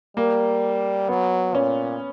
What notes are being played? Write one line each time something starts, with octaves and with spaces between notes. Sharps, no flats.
G3 A#3
F#3 B3
A#2 C#4